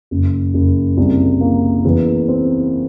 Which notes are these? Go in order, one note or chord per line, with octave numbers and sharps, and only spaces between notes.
F#1
F#1
C2
A#3
E2
C4